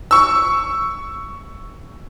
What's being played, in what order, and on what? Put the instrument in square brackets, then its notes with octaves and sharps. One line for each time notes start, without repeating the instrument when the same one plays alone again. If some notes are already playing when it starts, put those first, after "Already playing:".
[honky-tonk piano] C#6 E6